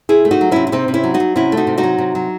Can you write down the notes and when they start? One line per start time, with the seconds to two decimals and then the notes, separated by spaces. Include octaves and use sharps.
0.09 C3 E4 G#4
0.25 A3
0.31 D#4 F#4
0.41 F#3
0.51 C3 C#4 E4
0.67 E4
0.72 C3 C4 D#4
0.88 C3
0.94 C#4 E4
1.04 F#3
1.14 D#4 F#4
1.20 F#3
1.36 C3 C#4 E4
1.52 A3
1.57 D#4 F#4
1.67 C3
1.78 D#4 F#4
1.83 F#3
1.98 C3
2.15 F#3